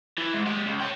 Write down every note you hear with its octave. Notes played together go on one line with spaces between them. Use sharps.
E3
G#2
G#3 G4
C#2
C#5 G5